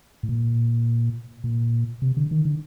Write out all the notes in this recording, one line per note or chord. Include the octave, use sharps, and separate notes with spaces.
A2
A#2
A#2
C3
D3
D#3
D3